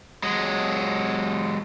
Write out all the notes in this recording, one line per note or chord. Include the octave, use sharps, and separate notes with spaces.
F#3 G#3